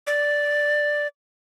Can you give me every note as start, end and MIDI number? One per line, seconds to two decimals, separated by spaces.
0.07 1.07 74